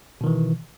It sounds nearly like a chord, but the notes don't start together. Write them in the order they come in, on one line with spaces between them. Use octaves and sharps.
B2 D#3 E3